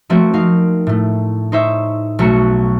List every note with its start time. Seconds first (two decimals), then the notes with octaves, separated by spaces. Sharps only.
0.09 F3 A3 A#3 C4 F#4
0.34 C4 D#4 A#4 F5
0.87 A2 A3
1.52 D#4 C5 C#5 E5
2.19 B1 A3 F#4 A#5 C#7